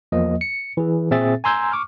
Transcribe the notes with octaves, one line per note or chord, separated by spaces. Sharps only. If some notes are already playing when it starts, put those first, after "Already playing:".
E2 F3 A#3 D#5
C#7
E3 G#4
A#2 C4 G#4 E5 A6
G#5 A#5 C6 E6 G6 G#6
C#6 D6 F6